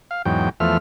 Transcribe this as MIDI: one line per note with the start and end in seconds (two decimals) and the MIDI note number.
0.11 0.22 77
0.25 0.49 40
0.25 0.49 44
0.25 0.49 54
0.25 0.49 79
0.60 0.78 40
0.60 0.78 53
0.60 0.78 57
0.60 0.78 76
0.60 0.78 89